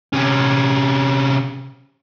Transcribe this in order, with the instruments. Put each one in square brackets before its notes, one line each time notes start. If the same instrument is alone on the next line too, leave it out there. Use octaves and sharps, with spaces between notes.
[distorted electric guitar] C3 C#4